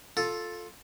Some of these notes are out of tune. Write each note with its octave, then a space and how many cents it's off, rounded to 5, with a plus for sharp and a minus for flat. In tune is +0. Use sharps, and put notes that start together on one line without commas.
F4 +10 A4 +0